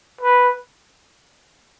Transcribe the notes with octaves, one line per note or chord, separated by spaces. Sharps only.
B4